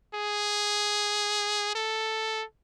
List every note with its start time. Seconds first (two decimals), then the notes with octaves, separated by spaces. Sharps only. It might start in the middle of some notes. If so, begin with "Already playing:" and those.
0.14 G#4
1.75 A4